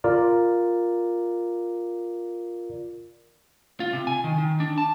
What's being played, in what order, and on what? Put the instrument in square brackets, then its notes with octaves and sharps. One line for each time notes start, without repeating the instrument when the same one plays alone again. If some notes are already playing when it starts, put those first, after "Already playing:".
[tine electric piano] F4 A#4 D5
[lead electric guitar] F4
C3
G#5
D#3
D#3
D4
A5